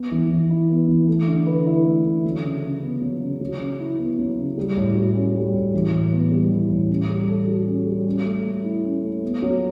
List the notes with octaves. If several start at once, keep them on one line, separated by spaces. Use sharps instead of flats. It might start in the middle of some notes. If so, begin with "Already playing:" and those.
Already playing: B3
E3
E3
E4
B3
E3
A3
D3
B4
E4
A3
D3
F#3
C#3
C#3
B3
F#3
C#3
F#3
C#3
E4
B3
F#3
C#3
G3
A2
F#4
C#4
G3
A2
E3
A2
B3
G3
E3
A2
C#4
G3
A4
F#4
C#4
G3
C#4
A3
A3
E4
C#4
A3
B3
F#3